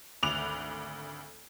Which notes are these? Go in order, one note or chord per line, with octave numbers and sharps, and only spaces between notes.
G#1 D2 B5 D6 F#6 F7